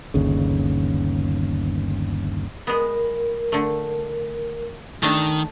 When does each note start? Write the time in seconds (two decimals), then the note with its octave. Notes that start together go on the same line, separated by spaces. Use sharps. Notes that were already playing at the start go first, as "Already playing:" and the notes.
0.14 G1 D#2 C#3
2.67 G#3 B3 A#4
3.52 D3 A3
5.03 D#3 A3 D4 A5